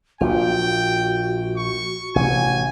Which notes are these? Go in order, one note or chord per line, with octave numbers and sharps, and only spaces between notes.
A#1 A#2 F4 F#4 G5
C#6
A1 C3 G#5